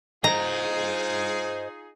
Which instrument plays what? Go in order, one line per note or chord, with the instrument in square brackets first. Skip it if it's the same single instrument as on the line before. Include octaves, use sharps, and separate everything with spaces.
[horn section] D#4 F4 G#4 [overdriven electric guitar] C5 D#5 [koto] A#5